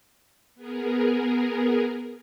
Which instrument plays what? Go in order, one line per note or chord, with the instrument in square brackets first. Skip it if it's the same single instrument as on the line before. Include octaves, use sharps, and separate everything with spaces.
[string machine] B3 G#4 A#4